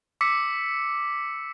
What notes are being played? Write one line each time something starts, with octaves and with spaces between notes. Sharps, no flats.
D6 E6 B6 C#7